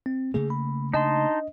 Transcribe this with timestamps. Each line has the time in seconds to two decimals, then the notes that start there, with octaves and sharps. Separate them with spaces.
0.06 C4
0.34 C#3 A3 A#3 G#4
0.50 B5
0.94 D4 D#4 D#5 A5 C6